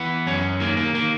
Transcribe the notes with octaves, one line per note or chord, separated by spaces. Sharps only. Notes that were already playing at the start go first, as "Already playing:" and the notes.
Already playing: E3 B3
F#2 C#4
D#3 A#3
A#3
D#3 A#3